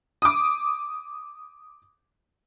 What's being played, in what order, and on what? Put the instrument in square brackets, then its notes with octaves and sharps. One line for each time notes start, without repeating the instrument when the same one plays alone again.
[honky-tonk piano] D6 D#6